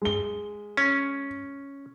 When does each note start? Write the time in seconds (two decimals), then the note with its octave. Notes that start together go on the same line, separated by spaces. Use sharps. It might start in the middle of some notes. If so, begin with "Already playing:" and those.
0.02 G#3 G7
0.77 C#4